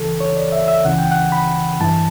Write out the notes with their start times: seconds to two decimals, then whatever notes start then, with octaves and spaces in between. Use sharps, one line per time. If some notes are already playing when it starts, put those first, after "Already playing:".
Already playing: C#2 C#3 E3 A4
0.20 C#5
0.37 D5
0.52 E5
0.68 E5
0.85 C#2 C#3 E3 F#5
0.98 G5
1.12 F#5
1.32 B5
1.80 G2 E3 A5